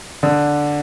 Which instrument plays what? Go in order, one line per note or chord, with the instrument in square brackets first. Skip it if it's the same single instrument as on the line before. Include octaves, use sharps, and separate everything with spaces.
[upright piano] D3